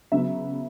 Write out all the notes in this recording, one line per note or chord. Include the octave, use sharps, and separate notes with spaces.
C#3 F#3 B3 E5